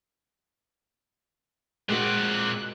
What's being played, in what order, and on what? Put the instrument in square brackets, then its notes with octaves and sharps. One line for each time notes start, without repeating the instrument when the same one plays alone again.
[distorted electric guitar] A#2 C4 [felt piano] G#3 F#4 [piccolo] F#6